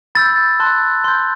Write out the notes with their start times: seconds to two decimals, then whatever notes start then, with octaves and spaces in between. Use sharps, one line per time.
0.15 B5 E6 G6 A6
0.60 A5 C6 F#6
1.04 C6 G6